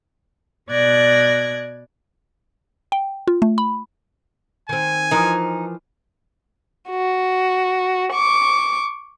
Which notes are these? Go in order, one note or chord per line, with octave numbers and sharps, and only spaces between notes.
B2 D5 F#6 G#6 A#6
G5
F4
A3
B5
D#3 C4 G#5
E3 F3 D#4 A#4
F#4
C#6 D6